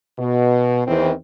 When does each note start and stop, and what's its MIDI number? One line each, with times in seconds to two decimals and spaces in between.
0.18 0.82 47
0.87 1.12 40
0.87 1.12 51
0.87 1.12 52
0.87 1.12 60